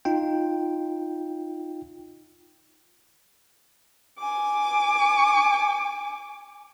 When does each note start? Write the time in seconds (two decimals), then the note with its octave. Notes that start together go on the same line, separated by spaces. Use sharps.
0.05 D#4 F4 G5
4.19 G#5 D6